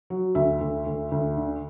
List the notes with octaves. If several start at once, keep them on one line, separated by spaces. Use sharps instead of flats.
F#3
D2 E5
D2
D2
D2
D3